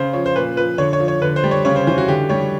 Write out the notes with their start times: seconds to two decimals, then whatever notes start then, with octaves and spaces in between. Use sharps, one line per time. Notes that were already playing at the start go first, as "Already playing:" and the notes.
Already playing: C#3 C5
0.13 F3 C#5
0.26 C5
0.35 A#2 B4
0.56 F3 B4
0.78 D3 C#5
0.93 C#5
1.00 F3
1.08 C#5
1.22 D3 B4
1.36 C5
1.44 G3
1.51 C#5
1.65 C#3 C#5
1.76 C5
1.87 E3 C5
1.98 F#4
2.08 D3 G4
2.29 G3 C#5